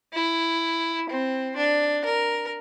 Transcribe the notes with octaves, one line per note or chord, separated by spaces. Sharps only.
E4
C4
D4
A#4